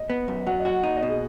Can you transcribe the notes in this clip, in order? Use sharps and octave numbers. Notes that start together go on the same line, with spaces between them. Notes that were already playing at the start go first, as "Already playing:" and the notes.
Already playing: D#5
B3
F#2
F#3 F#5
D#5
F#4 F#5
D#4 F#5
D#5
B2
G#4